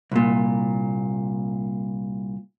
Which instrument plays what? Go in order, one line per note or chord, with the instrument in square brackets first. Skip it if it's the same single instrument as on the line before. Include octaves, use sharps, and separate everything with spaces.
[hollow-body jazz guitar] C2 A#2